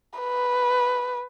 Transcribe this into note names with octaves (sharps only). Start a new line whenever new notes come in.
B4